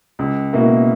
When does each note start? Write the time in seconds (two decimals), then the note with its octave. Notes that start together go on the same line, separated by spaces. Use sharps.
0.19 C#2
0.53 B2 A#3 E4 A#4